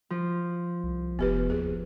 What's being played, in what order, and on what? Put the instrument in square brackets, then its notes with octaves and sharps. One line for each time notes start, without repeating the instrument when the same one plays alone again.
[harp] F3
[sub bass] C2
[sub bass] F1 [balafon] B3 G4 B4
[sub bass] D#2 [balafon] G#4